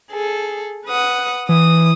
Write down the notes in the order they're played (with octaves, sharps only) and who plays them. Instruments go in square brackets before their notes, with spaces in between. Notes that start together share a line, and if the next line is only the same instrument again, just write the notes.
[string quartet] G#4 A4
B4 F#5 D#6
[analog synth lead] E3 [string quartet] D#6